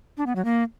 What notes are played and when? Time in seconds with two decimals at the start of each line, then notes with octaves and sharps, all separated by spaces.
0.17 D4
0.26 B3
0.36 F#3
0.45 A#3